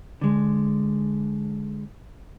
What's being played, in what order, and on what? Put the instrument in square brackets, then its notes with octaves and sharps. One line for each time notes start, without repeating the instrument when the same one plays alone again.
[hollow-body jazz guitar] D3 G#3